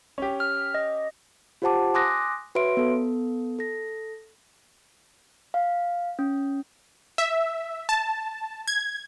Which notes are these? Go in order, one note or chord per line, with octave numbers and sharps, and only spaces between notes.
C#4 G4
F6
D#5
F4 G4 C5 F#5 A5 D6
G#5 C6 D6 D#6 F#6 A#6
F#4 B4 C#5 E5 C6 D7
B3 A4
A4 A#6
F5
C#4
E5
A5
G#6